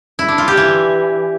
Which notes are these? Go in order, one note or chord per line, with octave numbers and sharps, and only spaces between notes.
E4
D4
F4
G4
E3